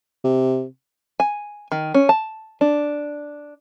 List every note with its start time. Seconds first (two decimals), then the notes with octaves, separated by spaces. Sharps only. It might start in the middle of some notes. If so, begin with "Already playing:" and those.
0.24 C3
1.20 G#5
1.72 D#3
1.94 C#4
2.09 A5
2.61 D4